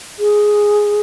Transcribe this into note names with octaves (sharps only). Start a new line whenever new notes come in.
G#4